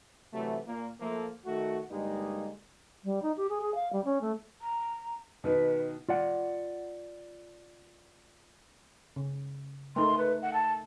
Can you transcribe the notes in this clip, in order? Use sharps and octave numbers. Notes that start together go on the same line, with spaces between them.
C3 E3 F#3 A3
A#2 A#3
F3 A3 A#3
D#3 A3 F#4
G2 D3 G3 G#3 A#3 D#4
G3
D#4
G4
G#4
G#4
F5
G3
C#4
A3
A#5
B2 D#3 B4
F4 D5 F#5
C#3
A3 D#4 A#4 C6
B4
F#5
A5